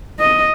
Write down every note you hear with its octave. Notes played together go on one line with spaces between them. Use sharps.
D#5